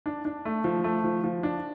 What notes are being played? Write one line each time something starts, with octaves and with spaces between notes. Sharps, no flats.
D4
D4
A3
F3
A3
F3
F3
D4